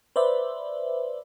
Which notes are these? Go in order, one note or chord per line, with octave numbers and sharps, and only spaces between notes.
B4 C5 D5 E5